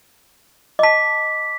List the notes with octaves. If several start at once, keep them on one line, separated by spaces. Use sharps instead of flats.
D#5 A5 D6 B6